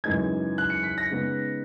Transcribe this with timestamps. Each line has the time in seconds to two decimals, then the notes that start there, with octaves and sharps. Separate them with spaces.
0.04 F#2 C#3 E3 G#3 D#4 G#6
0.58 F#6
0.70 C#7
0.83 B6
0.98 A#6
1.11 C#3 G#3 B3 D#4